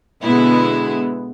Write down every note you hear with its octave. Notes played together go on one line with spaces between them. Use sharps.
B2 D3 G#3 B3 E4